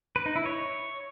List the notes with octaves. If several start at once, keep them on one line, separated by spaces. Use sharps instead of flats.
B4
D#4
E4
C#5